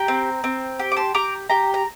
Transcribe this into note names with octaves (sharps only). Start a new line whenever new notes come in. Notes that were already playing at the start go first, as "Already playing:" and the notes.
Already playing: G4 G5 A#5
C4
C4
G4
D6
A5 C6
G4 A#5 D6
G4 G5 A#5
A#5